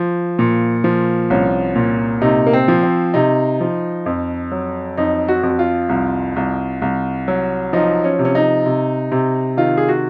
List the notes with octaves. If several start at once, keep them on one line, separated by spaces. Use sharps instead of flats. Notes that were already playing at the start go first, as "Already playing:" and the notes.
Already playing: F3
A#2
F3
C2 C#4
A#2
C3 D#4
A#3
C4
F3
C4
C3 D#4
F3
F2
F#3
F2 D#4
F#4
F2
F#4
F4
C2
C2
C2
F#3
F3 D#4
C#4
C3
C#4
D#4
C3
C3
D#3 F4
G#4
F#4